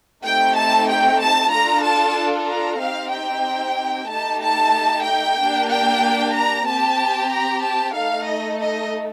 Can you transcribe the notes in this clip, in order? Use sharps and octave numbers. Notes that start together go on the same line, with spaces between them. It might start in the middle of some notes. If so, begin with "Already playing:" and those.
A3 C4 D#4 G4 G5
A5
G5
A5
D4 F4 A4 A#5
A5
A#5
C4 D#4 G4 F5
G5
A3 D#4 G4 A5
A5
G5
A#3 D4 G4
G5
A#5
C4 G4 A5
A#5
A5
A3 D#4 A4 F5
D#5
D#5